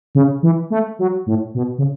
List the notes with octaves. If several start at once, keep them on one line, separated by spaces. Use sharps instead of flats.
C#3
E3
A3
F#3
A2
B2
C#3